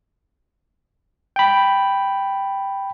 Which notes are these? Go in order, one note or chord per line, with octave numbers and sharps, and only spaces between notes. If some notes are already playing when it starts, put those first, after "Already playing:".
G5 B5